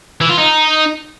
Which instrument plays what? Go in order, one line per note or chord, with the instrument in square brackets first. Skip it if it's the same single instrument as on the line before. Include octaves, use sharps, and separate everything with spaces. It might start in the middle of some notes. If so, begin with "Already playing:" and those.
[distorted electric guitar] E3
F4
D#4